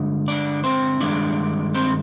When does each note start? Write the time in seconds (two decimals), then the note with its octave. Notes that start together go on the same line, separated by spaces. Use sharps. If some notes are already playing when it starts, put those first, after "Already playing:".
Already playing: G2 D3 G#3
0.28 D4 D5
0.64 C4 C5
1.00 G2 D#3 G#3 D4 D5
1.75 C4 C5